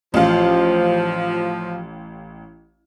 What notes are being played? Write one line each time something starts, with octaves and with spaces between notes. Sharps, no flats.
A1 F3 F5